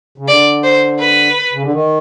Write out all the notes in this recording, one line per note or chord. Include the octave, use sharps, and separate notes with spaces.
C#3
D3 D5
C5
B4
C#3
D3
D#3